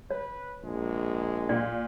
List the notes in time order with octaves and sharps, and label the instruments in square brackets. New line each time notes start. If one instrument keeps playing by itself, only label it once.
[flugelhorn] B4 [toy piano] C#5
[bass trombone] A#1 [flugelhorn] G#3
[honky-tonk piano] A#2 [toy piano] D5